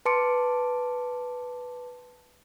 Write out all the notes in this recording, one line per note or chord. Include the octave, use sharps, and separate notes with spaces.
B4 A5 C6 D6 C#7 D7